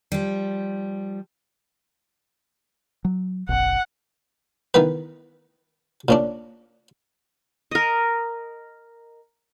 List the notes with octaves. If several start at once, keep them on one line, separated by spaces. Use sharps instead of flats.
F3 G3
F#3
F#1 B1 F#5
D#3 E3 B3 B4
A#2 C#4 D4
A#4 D#5